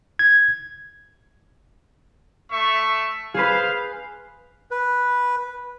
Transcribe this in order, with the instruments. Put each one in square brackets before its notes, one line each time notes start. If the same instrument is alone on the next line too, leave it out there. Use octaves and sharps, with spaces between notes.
[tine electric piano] G#6
[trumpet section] A3 E5 C#6
[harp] G#4 B4 [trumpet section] C5 F5
[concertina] B4